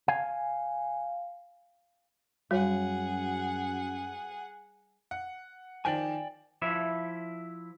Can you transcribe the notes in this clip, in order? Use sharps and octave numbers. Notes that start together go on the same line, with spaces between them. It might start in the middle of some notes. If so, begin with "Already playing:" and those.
F5 G#5
F#2 G3 F#4 G#4 C#5 F#5
F#5
D#3 F3 D5 G5 G#5
F3 E4 E5